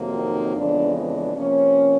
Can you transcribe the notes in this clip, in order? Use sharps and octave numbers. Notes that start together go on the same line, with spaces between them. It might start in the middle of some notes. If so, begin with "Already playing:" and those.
Already playing: F2 C3 D#3 F#3 A#3
D#4
F2 C#3 E3 G#3 B3 D4
D4
C3 F3 A#3 C#4